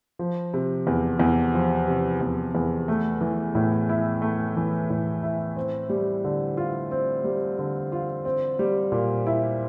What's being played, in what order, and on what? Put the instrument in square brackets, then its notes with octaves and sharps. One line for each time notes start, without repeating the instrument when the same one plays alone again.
[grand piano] F3
C3
E2
E2
F3
C3
E2
E2
A3
E3
A2
E4
A3
E3
A2
E4
C4
G3
D3
F4
C4
G3
D3
F4
C4
G3
A#2
E4